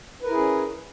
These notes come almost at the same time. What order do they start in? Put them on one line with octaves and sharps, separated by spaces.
B4 A#4 E4 G#4 C#4